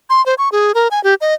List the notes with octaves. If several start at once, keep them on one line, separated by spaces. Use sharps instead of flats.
C6
C5
C#6
G#4
A#4
G#5
G4
D#5